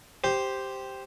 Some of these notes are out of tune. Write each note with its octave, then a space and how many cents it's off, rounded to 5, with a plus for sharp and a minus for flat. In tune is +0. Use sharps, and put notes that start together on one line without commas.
G4 +0 C5 +0